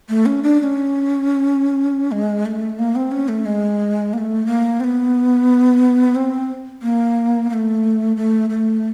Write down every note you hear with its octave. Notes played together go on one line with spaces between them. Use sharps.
A3
C#4
D4
D4
C#4
G#3
A3
A#3
C4
C#4
A3
G#3
A#3
A3
A#3
C4
B3
C4
A#3
A#3
A3
A3
A3